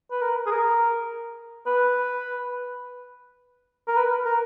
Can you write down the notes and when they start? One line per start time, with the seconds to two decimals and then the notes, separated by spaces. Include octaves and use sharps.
0.11 B4
0.21 A#4
0.46 G#4
0.51 A#4
1.66 B4
3.88 A#4
3.97 B4
4.25 A#4